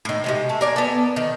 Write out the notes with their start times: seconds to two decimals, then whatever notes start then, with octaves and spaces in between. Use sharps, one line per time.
0.05 A2 D#3
0.24 C3 F3 G#3
0.49 A3
0.61 A#4 D5 G#5
0.76 B3 A4
1.16 D#3